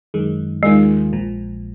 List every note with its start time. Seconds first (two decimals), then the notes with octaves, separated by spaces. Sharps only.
0.14 F#2 D#3 G#3
0.63 D#2 D#3 G#3 A#3 F4 G#4
1.13 A#1 A#2 F3